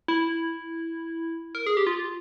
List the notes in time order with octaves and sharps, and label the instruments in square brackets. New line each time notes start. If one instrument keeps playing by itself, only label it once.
[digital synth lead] E4
A#4
G#4
G4
F4